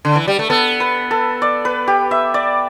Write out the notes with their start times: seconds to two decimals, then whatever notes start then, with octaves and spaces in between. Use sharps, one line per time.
0.05 D3
0.16 E3
0.28 G3
0.39 A3
0.50 B3 A4
0.80 B4
1.11 A4
1.42 D5
1.65 B4
1.87 G4
2.11 E5
2.34 D5